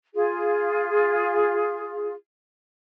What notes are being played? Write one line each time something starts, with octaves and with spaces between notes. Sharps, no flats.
F4 G#4